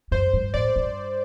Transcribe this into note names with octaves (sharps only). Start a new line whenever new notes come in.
F#2 C5
G2
A2 D5
G2